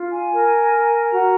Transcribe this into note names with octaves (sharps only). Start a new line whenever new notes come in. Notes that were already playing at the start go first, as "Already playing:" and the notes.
Already playing: F4
G#5
A#4
A#4
F#4 A#5